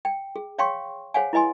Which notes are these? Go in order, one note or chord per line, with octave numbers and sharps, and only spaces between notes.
G5
G#4
C#5 F5 G5 C6 C#6
G#4 C5 C#5 F5 F#5 G#5
E4 B4 D#5 G#5 C6